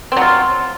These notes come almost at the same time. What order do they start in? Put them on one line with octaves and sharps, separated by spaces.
C4 F#3 F4